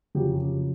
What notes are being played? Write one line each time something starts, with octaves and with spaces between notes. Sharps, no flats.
F#1 F2 C#3 F#3 G4